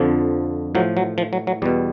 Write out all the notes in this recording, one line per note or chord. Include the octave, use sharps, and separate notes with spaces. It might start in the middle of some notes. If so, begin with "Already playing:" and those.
Already playing: F2 D3 F3
A2 F3 F#3
F#3
F3
F#3
F#3
E2 B2 G3